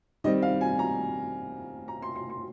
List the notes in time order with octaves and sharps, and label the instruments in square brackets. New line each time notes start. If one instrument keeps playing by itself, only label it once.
[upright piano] D#3 G3 C4 D#5
F5
G#5
A#5
A#5
C6
C6
C6